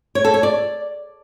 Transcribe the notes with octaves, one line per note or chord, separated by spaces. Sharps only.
C#5
A4
C#5
D5